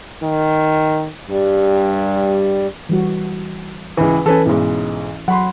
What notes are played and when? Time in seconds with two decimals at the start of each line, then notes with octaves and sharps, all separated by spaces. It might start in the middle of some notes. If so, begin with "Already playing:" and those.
0.23 D#3
1.30 G2 G3
2.89 E3 G3 F#4
3.97 C#2 E3 B4
4.26 E3 C#4 A4 B4 G#5
4.46 B1 G#2 E4
5.28 F#3 F#5 B5 C6